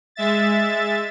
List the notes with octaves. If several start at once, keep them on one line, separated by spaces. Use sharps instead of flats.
G#3 E5 A6